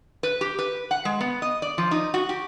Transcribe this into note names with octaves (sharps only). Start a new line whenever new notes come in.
B4
G4
B4
F#5
G#3
B3
D#5
D5
F3
D#4
F#4
G4